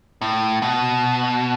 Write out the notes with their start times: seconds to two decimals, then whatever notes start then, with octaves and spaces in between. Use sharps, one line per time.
0.21 A2
0.62 B2